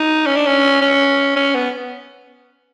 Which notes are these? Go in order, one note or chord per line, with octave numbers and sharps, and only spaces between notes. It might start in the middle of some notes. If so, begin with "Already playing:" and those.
Already playing: D#4
C#4
D4
C#4
C#4
C#4
B3